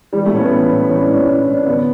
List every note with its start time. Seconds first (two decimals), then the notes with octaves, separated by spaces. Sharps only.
0.13 E3 G3
0.25 A3
0.32 A2 C#4
0.39 B3
0.51 E3
0.71 A2
0.89 E3 C#4
1.02 D4
1.09 A2
1.15 C#4
1.28 A2
1.43 A2 D4
1.55 C#4
1.66 D3 B3